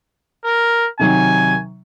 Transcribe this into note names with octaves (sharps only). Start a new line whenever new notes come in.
A#4
C3 D#3 F#3 G#5